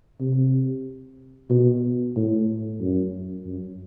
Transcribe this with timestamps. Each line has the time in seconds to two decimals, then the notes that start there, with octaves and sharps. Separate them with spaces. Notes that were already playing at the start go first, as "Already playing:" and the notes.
0.20 C3
1.50 B2
2.16 A2
2.81 F#2
3.46 F#2